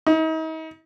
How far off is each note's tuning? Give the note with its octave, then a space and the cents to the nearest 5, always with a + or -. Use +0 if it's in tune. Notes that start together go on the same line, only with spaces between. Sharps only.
D#4 +40